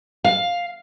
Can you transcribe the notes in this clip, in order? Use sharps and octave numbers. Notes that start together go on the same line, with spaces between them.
F5